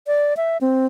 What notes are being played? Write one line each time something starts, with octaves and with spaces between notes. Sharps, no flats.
D5
E5
C4